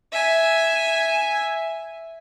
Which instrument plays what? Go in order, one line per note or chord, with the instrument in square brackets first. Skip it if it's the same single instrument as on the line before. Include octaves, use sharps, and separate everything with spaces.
[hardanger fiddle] E5 G#5